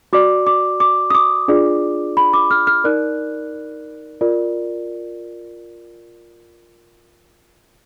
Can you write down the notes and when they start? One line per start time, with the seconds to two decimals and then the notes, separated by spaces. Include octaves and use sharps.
0.13 F#4 D5 D6
0.47 D6
0.80 D6
1.10 D#6
1.15 D6
1.48 D4 F4 G#4 D5
2.17 B5
2.33 D6
2.51 F6
2.67 F6
2.84 D#4 A#4 D5 F#6
4.21 F4 A#4 D5